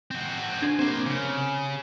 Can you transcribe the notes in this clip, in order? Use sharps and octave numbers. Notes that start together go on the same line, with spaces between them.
C4 F#4
D3 G#5 C6
C3 A#3 C5
C#3